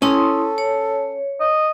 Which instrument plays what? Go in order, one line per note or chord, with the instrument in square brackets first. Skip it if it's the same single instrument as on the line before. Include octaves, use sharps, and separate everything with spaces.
[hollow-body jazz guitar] C#4 [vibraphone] E4 C6 D#6 [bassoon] A4
[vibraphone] C#5
[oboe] D#5